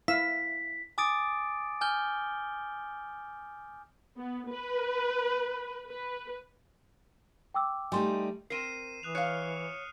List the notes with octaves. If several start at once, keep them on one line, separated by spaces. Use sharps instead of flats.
E4 F5 E6 B6
G#5 D6 D#6 A6 D7
G#5 F6 G6 G7
B3
B4
B4
G5 D6 E6
G3 A3 D#4 G#5 C6
C4 A#4 C7 D#7 E7
E3 D#6 F#6 F7
C#5 F5 F6 F#6 C#7